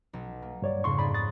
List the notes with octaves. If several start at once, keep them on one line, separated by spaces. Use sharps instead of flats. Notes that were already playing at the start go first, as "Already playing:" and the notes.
B1
A#3
G2 C#5 D5
F2 G#2 C#3 C6 C#6
D#4 G#4 D5 B5
D#6 F#6 A6